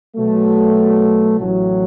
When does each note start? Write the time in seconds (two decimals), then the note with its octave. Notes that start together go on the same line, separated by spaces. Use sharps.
0.16 B2 F#3 A3
1.39 A1 A2 F#3